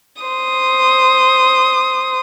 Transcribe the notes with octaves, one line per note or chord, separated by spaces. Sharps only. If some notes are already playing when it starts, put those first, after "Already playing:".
C5 D#6